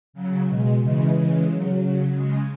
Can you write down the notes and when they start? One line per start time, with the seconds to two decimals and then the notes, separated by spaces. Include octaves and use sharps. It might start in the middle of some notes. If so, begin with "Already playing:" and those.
0.13 C#3 F#3
0.48 B2 G#3
0.80 C#3 E3 G#3
1.13 C#3 E3 G#3
1.46 C#3 F#3
1.81 C#3 F#3
2.13 C#3 G#3